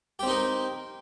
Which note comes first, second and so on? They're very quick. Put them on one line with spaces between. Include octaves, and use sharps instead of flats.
G4 C4 D#4 A#4